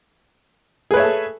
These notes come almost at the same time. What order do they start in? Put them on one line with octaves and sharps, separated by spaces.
G#4 B4 C#5 E5 A4